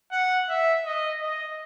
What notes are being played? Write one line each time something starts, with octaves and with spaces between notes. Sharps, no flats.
F#5
E5
D#5
D#5